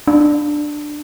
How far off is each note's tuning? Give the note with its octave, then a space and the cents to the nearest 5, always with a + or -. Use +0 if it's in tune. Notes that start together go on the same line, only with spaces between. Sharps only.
D4 +10